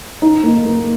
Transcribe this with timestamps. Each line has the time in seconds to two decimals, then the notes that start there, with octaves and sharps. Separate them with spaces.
0.22 D#4
0.43 A#3
0.65 A#3